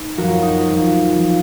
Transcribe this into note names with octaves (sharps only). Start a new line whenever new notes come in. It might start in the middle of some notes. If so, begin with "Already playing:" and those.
Already playing: D#4
F#2 F3 F#4 A#4
D#4
F2
F3
F3